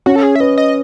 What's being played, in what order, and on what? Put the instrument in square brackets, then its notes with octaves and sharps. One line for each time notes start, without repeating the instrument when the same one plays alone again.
[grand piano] C#4 [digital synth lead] F#4
[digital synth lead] A4
G#4
E5
[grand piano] B4 [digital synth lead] D#5
[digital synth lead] D#5